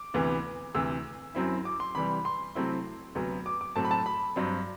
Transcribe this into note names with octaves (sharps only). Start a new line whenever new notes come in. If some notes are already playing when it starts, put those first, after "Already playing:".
Already playing: D6
D2 C3 E3 B3
D2 C3 E3 E6
F#2 F#3 C4 E4
D6
C6
C3 E3 G3 B5
C6
C3 F#3 A3 C4 E4
D2 C3 F#3 B3
D6
D6
A2 F#3 A3 C4 A5
B5
A5
B5
G2 F#3 C4